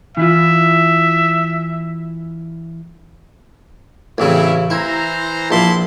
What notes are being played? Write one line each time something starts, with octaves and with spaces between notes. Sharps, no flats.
E3 E4 F4 E5
A1 C#3 C4 C#4 E4
E3 E4 C5 A#5
A#1 E4 A5 C6